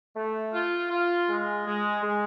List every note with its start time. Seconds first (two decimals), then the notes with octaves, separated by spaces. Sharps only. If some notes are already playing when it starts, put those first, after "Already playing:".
0.15 A3
0.53 F4
0.91 F4
1.28 G#3
1.66 G#3
2.03 G#3